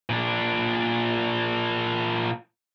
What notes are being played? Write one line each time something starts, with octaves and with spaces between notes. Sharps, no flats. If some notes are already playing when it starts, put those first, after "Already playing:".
A#2 D4